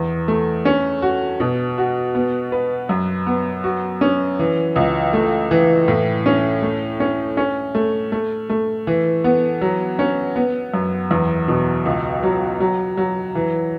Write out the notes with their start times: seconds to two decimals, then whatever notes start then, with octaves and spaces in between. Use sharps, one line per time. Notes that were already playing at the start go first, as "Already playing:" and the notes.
Already playing: E2
0.28 A3
0.65 C#4
1.02 F#4
1.40 B2
1.78 F#4
2.15 B3
2.52 B4
2.89 F#2
3.27 B3
3.64 F#4
4.01 C#4
4.39 E3
4.76 C#2
5.13 A3
5.51 E3
5.88 A2
6.26 C#4
6.63 A3
7.00 C#4
7.37 C#4
7.75 A3
8.12 A3
8.50 A3
8.87 E3
9.24 B3
9.61 F#3
9.99 C#4
10.36 B3
10.74 F#2
11.11 E2
11.48 B2
11.85 C#2
12.23 F#3
12.60 F#3
12.97 F#3
13.35 E3